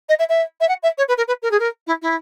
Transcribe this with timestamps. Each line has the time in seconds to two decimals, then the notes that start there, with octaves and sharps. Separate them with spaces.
0.09 D#5
0.19 E5
0.29 E5
0.61 E5
0.69 F#5
0.83 E5
0.98 C#5
1.08 B4
1.17 A#4
1.28 B4
1.42 A#4
1.51 G#4
1.60 A#4
1.87 E4
2.02 E4